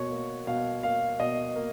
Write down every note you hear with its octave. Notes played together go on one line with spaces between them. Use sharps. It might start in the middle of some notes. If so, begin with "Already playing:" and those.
Already playing: B2 A#3 F#4 C#5
A#3
B2 F5
A#3 F5
B2 D#5
A#3